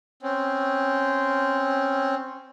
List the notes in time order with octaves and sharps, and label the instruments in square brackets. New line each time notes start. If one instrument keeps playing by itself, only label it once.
[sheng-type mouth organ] C4 C#4